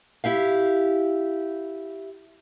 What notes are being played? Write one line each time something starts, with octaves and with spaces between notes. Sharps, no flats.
E4 G4 F5